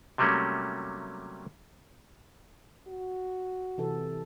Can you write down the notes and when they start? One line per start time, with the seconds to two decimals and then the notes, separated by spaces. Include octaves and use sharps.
0.18 C3 F#3 G3 A3 A#3 C#4
2.88 F#4
3.78 C3 E3 A4